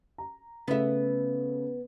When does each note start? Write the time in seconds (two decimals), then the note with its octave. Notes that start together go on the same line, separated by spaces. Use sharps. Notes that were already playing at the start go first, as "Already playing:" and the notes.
0.18 A#5
0.68 C#3 A3 B3 E5